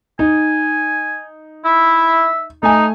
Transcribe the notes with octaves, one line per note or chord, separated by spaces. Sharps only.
D#4 G#5
E4 E5
A3 D#4 G#5